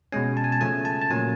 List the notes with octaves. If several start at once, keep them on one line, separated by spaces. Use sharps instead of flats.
B2 G#3 C#4 G#5
A5
G#5
A5
C#3 F3 A3 G#5
A5
A5
A#2 F#3 A#3 C#4 G#5